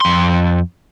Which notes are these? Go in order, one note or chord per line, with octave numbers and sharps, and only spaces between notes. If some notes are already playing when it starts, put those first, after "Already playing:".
F2 C6